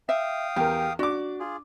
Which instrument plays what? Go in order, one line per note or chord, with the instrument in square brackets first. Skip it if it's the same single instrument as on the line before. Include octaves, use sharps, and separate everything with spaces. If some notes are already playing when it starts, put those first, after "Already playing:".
[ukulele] E5 [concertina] F5 G5 D#6
[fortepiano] E2 A#4 [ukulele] G4
[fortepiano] D4 D6 [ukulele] F#4
[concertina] F4 G#4